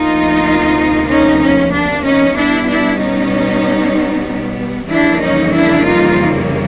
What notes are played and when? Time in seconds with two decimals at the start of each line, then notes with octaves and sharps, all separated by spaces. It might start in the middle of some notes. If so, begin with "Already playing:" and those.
Already playing: D2 C3 F3 A#3 D#4 F4
1.09 C#4 D#4
1.41 C#4
1.72 D4
2.04 C#4 D#4
2.36 B2 G3 B3 D4 E4
2.68 D4 E4
3.00 C#4 D#4
4.90 F2 C#3 E3 G3 A#3 D4 E4
5.22 C#4 D#4
5.54 D4 E4
5.86 D#4 F4